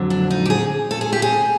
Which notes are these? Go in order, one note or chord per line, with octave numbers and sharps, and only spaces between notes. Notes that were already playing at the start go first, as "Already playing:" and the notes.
Already playing: F2 D3 F#3
D4
D#4
G4
G#4
A4
G#4
G4
G#4